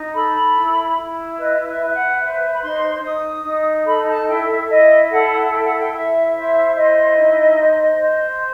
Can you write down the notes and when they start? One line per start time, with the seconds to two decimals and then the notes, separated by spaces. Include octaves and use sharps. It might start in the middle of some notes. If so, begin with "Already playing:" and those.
Already playing: D#4
0.13 A4 B5
0.54 E4
0.97 E4
1.37 B4 D#5
1.65 E5
1.78 B4
1.85 E5
1.92 F#5
2.20 C5 E5
2.54 B5
2.62 D#4 C6
3.02 D#4 D#6
3.44 D#4
3.85 A4 B5
4.07 A5
4.27 E4 G5
4.47 E5
4.68 E4 D#5
5.10 A4 F#5
5.51 E4 G5
5.64 F#5
5.77 G5
5.92 E4 E5
6.33 C5 E5
6.75 E4 D#5
7.16 D#4
7.57 C5
7.99 C5